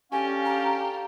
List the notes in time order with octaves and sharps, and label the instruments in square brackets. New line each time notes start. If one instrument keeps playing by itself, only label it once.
[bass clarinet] C#4 [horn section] D4 A4 F5 [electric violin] G4 [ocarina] G#5
[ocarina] A#5